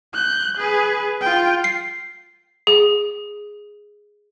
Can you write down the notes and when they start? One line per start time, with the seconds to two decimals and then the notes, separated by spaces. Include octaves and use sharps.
0.14 F#6 G6
0.57 G#4 B4
1.21 F4 G5
1.64 C7
2.67 G#4